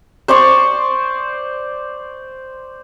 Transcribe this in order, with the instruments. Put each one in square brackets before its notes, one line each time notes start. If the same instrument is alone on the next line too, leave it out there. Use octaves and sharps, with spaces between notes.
[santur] C5 D5 C6 C#6